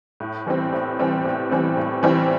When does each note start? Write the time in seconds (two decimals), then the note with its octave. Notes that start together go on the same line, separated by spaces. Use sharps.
0.20 A2
0.46 E3 G3 C4
0.72 A2
0.99 E3 G3 C4
1.25 A2
1.51 E3 G3 C4
1.77 A2
2.03 E3 G3 C4